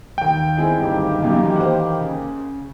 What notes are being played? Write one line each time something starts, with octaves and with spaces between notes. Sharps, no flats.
D#2 D#3 G5
G#3 C4 E4 G#4
F#1 D2 G2 D#3 A#3 G4
F#2 A#2 C#3 E3 F#3
C5 F#5
C#3